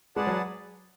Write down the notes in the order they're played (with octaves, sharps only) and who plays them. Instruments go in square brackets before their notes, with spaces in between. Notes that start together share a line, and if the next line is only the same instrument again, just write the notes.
[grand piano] G#3 [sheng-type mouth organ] G#4 B4 D5 F#5 A5
[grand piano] F#3